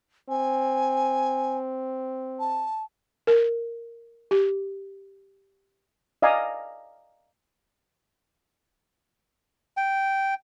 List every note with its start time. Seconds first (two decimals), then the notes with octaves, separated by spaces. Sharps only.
0.29 C4 G#5
2.39 A5
3.27 A#4
4.31 G4
6.22 D5 D#5 F5 G#5 A#5
9.77 G5